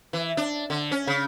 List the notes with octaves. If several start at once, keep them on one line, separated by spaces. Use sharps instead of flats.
E3
D4
D3
C#4
C#3